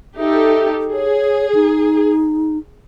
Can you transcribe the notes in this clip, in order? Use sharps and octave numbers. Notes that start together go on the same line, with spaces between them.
D#4 G4 A4 E5
G#4 C#5
D#4